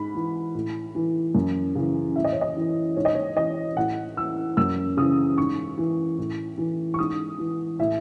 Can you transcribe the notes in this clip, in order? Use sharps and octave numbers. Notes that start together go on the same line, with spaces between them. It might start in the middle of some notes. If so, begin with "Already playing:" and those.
Already playing: G#2 B5
E3
A2
E3
F#2
C#3 E3
A2 E5
D#5
C#5
D#5
E3
G#2 C#5
D#5
C#5
E3 D#5
A2 F#5
E3 E6
F#2 E6
C#3 E3 D#6
G#2 C#6
E3
A2
E3
C#6
G#2 D#6
E3
A2 E5